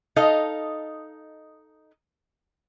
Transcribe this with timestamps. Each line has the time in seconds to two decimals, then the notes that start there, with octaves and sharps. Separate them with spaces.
0.16 D#4 A4 D#5 F5